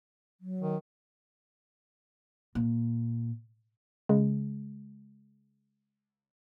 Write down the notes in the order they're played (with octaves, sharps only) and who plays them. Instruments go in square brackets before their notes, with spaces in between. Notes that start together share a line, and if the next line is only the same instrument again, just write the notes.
[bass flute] F#3
[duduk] D#3
[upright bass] A#2
[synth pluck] C#3 G#3